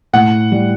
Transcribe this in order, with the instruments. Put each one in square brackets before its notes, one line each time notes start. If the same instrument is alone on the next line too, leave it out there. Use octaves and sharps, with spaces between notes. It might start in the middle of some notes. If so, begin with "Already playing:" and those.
[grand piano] A2 [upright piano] F#5
[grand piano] G3